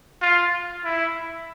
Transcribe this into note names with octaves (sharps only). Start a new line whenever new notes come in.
F4
E4